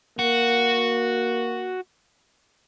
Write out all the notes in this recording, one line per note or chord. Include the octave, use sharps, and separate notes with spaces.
A#3 F#4